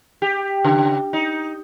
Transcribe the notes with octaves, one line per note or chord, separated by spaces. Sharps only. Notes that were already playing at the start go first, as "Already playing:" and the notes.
G4
C#3
D#4